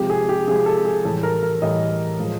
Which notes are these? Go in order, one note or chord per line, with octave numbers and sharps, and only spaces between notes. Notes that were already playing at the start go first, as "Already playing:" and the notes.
Already playing: C3 F3 G#3 G4
G#4
G4
C3 F3 G#3 G#4
A4
G#4
A2 E3 G3 A4
A#4
A#4
A2 E3 G3 D#5
A2 F3 G#3